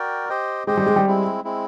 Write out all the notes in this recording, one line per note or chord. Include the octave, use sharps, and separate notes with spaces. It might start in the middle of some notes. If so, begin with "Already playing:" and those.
Already playing: F#4 A#4 D5 G5
G4 C5 D#5 G5
G#3 G4 C5 D#5 G5
G3
G#3
G3
G#3 C4 E4
G#3 C4 E4